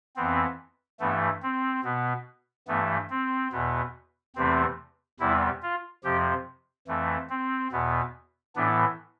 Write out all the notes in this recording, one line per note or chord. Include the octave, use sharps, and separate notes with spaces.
F2 E3 B3 C4
G2 E3 A3 B3
C4
B2 B3
G2 E3 A3 B3
C4
E2 B2 B3
E2 C3 E3 A3 C4
E2 C3 G3 B3 E4
F4
F2 C3 F3 G4
F2 E3 A3
C4
E2 B2 B3
A2 E3 B3 D4